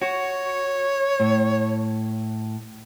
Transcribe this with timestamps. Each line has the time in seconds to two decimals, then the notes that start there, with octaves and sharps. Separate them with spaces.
0.02 F#4 C#5
1.20 A2